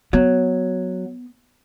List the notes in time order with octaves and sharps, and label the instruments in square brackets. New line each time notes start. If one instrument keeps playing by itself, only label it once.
[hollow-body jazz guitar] F#3 [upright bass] B3